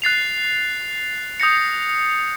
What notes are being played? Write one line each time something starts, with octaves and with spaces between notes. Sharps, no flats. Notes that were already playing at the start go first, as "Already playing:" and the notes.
F#6 A6 C7 F7
D#6 G6 A#6 C#7